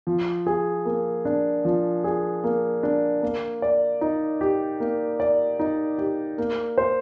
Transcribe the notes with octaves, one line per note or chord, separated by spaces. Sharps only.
F3
G#4
A#3
D4
F3
G#4
A#3
D4
A#3
D5
D#4
G4
A#3
D5
D#4
G4
A#3
C5